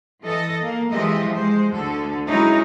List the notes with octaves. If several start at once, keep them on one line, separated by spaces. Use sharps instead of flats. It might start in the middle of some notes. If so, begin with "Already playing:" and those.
E3 A4 D#5
A#3
E3 F3 G#3 G4 D#5 E5
G#3 C5
D2 D3 A4
F#3 G#3 C#4 D#4 E4